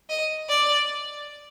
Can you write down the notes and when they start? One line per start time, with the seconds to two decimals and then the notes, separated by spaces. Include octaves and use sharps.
0.09 D#5
0.49 D5